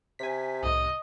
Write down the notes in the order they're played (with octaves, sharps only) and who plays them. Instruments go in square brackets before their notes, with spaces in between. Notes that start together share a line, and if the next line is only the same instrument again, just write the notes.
[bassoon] C3 [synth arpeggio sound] G#5 B6
[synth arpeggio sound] C2 A2 [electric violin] D#5